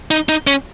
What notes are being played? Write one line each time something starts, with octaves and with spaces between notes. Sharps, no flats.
D#4
D#4
C#4